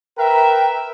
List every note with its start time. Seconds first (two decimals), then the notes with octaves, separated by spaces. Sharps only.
0.18 A#4 B4 E5 G5